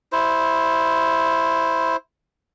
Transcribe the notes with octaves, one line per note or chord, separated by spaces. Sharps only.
E4 C5